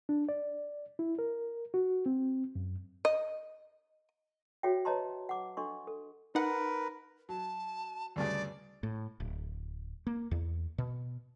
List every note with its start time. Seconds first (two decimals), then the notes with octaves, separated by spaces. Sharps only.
0.09 D4
0.29 D5
0.99 E4
1.19 A#4
1.74 F#4
2.06 C4
2.55 F#2
3.05 D#5
4.63 F#4 G#4 C#5 E5 G5
4.85 B4 C#5 D#5 A5 A#5 C6
5.29 F#5 D6
5.57 D4 A4 D#5 C6 C#6
5.87 A4
6.35 D#4 A#4 B4 F#5
7.29 F#3 A5
8.16 D2 G2 C#3 D5
8.83 A2
9.20 D1
10.07 A#3
10.31 E2
10.78 B2